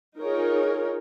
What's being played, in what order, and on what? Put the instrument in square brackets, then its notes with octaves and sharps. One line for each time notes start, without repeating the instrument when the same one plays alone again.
[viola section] D#4 F4 G#4 A#4 C#5